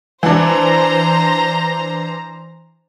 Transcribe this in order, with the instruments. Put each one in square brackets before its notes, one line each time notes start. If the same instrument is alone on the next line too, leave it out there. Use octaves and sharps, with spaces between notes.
[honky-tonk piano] E3 D4 [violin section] C5 A#5